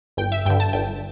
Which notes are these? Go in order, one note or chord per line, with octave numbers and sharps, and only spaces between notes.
G1 G5
E5
G2 D3 G5
A5
G1 G5